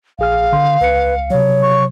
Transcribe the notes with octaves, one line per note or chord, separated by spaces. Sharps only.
A#1 G#4 F5 F6
D3 C6
C#2 B4 C#7
C3 F#3 C#5
C#6